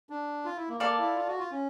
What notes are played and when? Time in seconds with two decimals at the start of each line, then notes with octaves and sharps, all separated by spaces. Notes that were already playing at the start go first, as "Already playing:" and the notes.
0.10 D4
0.45 F4
0.57 E4
0.68 A#3
0.80 A#3 A4 D5 F5 A5
0.99 E4
1.15 F4
1.28 F#4
1.39 F4
1.51 C#4